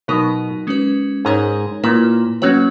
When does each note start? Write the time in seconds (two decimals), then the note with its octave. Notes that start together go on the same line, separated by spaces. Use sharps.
0.08 B2 F#3 B3 D#4 A#4
0.67 G#3 C#4 F#4 B4
1.25 G#2 G#3 D#4 A#4 C#5
1.83 A#2 A#3 E4 B4
2.42 F#3 A#3 C#4 F#4 B4